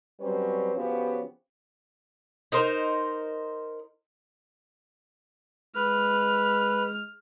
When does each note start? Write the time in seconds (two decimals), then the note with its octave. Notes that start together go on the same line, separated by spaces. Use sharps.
0.21 F#3 G3 C4 C#4 B4 C5
0.75 C#3 F3 B3 C#4 F#4 G4
2.52 D#4 A#4 C5
5.76 G#3 B4 F6